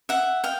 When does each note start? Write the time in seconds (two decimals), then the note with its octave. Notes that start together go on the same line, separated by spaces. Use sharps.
0.09 E5 F#5
0.44 F5 G5